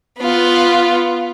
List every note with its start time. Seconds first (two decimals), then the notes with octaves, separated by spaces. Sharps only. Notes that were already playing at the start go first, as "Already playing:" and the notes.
0.19 B3 F4